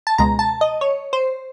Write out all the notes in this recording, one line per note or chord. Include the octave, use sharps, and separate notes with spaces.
A5
C#2 B2 G#3 A#5
A5
D#5
C#5
C5